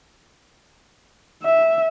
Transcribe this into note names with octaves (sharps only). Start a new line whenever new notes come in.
E5